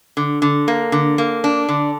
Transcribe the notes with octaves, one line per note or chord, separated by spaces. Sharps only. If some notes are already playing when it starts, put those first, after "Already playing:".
D3
D3
A#3
D3
A#3
D4
D3